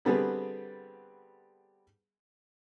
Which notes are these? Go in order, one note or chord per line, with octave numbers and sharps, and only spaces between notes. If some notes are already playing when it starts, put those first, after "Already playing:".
D3 G3 B3 C4 G#4 B4